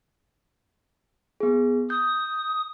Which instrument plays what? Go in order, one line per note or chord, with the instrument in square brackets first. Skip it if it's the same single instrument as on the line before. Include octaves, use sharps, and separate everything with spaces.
[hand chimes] B3 G#4
[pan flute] D#6 [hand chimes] G6